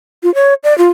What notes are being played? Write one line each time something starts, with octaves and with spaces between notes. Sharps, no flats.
F4
C#5
D5
F4